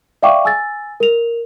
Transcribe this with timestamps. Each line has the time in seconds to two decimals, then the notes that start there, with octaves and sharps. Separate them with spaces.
0.22 D5 E5 F5 G5 C#6 D6
0.45 G#5 E6 A6
1.00 A#4 F7